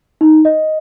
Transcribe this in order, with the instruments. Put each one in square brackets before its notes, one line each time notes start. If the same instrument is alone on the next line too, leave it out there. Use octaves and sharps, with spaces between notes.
[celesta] D#4
D#5